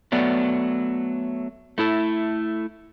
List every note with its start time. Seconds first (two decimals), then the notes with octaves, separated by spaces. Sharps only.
0.12 F#3 A3 B3 D5
1.78 A3 E4 A4